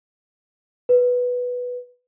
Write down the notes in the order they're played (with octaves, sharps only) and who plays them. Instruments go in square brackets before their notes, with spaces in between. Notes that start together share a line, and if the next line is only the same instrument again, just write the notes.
[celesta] B4